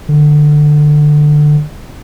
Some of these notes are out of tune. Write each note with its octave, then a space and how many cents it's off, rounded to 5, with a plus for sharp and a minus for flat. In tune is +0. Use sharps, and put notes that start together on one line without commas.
D3 +20